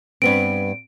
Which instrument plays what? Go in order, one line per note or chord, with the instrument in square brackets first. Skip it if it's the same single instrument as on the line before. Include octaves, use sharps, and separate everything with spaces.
[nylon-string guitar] G2 B3 C4 [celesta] D7